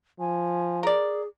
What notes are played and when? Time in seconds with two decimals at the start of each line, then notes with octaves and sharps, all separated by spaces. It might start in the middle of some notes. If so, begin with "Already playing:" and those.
0.20 F3 G#5
0.83 G#4 A#4 D5